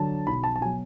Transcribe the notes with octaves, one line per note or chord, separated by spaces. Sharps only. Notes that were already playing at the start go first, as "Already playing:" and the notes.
Already playing: D3 F#3 A5
B1 B5
A5
A5
B2 F#3 G#5